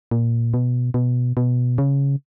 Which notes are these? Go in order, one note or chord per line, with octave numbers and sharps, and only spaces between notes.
A#2
B2
B2
B2
C#3